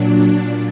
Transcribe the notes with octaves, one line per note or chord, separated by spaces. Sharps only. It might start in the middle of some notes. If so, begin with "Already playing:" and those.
Already playing: A#2 F#3 D4
A#2